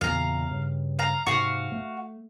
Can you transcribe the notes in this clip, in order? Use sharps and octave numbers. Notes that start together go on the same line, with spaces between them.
E2 A#2 C#3 F5 A#5
G2 C#3
F5 A#5
G#2 C3 F#4 F5
A3